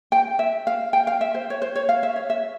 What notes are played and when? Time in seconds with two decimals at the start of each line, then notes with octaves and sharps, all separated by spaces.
0.12 G5
0.39 E5
0.67 F5
0.93 G5
1.07 F5
1.21 E5
1.34 C5
1.50 C#5
1.62 C5
1.76 C#5
1.89 F5
2.03 E5
2.16 C#5
2.30 E5